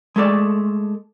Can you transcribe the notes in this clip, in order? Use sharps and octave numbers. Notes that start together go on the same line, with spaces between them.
G#3 A3 A4 D5